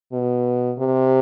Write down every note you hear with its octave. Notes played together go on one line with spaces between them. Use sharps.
B2
C3